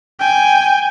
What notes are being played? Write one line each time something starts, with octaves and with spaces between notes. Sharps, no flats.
G5 G#5